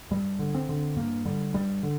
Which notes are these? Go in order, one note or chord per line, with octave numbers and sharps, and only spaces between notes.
G2 G3
D3
C4
D3
G2 A#3
D3 G3
G2 G3
D3